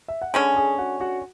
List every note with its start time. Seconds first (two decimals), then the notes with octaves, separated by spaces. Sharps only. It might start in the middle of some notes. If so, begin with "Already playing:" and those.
0.08 E5
0.22 F#5
0.34 D3 G#3 C#4 G#4 G#5
0.56 G#4 G#5
0.79 F#4 F#5
1.00 F#4 F#5